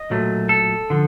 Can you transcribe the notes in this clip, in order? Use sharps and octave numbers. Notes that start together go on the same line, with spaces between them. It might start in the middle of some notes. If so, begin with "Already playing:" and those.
Already playing: D#5
B1 A#2 F#3 A3
A4
D3 F3